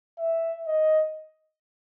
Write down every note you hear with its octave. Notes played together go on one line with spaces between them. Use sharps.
E5
D#5